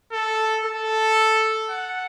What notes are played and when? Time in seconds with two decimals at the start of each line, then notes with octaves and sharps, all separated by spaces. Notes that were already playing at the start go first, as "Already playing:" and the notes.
0.13 A4
0.65 A4
1.70 F#5